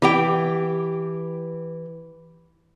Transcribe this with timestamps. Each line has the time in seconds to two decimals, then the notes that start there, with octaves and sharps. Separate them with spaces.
0.02 E3 G4 G5